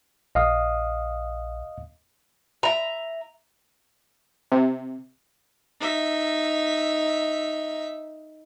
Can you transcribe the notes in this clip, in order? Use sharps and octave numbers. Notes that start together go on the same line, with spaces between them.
A#1 D#5 F5 D#6
E5 A#5
C3
D#4 E5